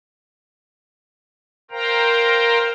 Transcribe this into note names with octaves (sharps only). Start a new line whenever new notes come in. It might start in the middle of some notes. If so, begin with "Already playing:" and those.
A#4 C5 F5 G5 A#5